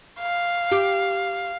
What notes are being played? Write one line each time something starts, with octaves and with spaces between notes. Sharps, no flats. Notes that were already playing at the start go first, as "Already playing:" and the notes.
F5
G4